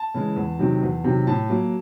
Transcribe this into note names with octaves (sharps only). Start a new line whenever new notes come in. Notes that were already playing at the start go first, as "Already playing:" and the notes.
Already playing: A5
C#3 E3 G#3
E2
C3 D#3 F#3
E2
C3 D#3 F#3
A2 A5
F#3 A#3